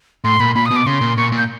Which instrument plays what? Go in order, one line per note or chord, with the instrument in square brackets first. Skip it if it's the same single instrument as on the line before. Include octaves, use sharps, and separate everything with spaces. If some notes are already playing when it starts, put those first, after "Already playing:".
[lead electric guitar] A2 [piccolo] C6
[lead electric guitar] A#2 [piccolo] B5
[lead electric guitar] A#2 [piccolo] B5
[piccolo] D#6
[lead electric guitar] B2
[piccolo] D6
[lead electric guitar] C#3 [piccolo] C6
[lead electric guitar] A#2
[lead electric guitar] A#2 [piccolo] C#6
[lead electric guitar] A#2
[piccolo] G6